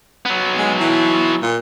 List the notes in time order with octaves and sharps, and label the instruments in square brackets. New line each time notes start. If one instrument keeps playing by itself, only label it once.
[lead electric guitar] F#3 B3
[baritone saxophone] G#3
E3
A#2